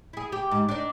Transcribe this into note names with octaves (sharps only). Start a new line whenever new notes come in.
E4 G#4
G4
G#2
D4 D#4 D5